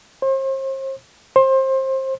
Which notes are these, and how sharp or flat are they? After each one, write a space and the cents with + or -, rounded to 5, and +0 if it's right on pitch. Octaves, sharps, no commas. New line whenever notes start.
C5 +40
C5 +25